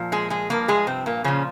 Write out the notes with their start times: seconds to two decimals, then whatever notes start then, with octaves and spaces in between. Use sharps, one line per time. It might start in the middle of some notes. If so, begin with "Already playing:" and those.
Already playing: A#2 F3
0.12 G#3 G#4
0.30 G#3 G#4
0.50 G2 F3 A#3 A#4
0.68 G#3 G#4
0.87 C3 C4
1.06 A#2 A#3
1.24 A#2 C#3 F3 C#4